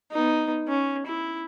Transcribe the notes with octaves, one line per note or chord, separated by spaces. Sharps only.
B3 D#4
C#4
E4